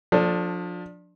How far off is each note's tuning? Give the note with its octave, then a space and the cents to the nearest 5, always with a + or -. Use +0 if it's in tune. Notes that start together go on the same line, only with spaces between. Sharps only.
F3 +30 D4 +5 A4 +0